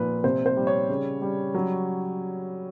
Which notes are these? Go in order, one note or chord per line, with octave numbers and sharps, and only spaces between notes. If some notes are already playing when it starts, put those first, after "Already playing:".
Already playing: A#2 F3 B4
C3 C5
C5
G3
C#5
C#3
G3
F#3